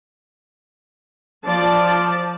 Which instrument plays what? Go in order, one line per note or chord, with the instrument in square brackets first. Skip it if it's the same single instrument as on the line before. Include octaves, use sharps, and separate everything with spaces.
[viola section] F3 D5 A5